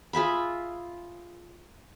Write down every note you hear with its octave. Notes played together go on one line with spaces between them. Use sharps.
F4 G#4 E5 B5